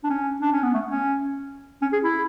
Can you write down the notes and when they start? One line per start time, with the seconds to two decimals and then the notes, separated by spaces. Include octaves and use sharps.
0.04 D4
0.10 C#4
0.42 D4
0.53 C#4
0.63 B3
0.74 A3
0.91 C#4
1.82 C#4
1.93 G#4
2.03 E4